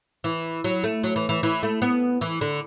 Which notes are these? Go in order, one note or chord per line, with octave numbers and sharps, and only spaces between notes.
E3
F#3
A3
F#3
E3
E3
E3
A3
B3
E3
D3